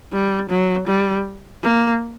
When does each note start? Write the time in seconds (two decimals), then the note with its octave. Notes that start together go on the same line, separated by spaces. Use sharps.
0.13 G3
0.50 F#3
0.87 G3
1.63 A#3